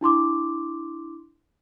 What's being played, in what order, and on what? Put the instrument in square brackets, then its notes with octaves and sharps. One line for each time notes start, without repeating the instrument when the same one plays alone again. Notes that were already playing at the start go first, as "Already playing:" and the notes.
[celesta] D4 E4 C6 D6